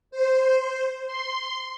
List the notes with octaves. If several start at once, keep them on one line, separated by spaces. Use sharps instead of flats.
C5
C6